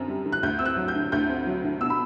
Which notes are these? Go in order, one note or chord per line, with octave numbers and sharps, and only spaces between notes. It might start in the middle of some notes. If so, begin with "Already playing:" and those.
Already playing: F#2 D3 C4
G3
D3
F#6
D2 G6
C4 E6
F#6
F#3
G6
D3
D2 G6
C4
F#3
D3
B2 E6
B5